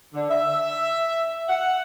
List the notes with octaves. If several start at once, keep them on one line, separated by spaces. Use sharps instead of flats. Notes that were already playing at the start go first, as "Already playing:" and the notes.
D3
E5
F#5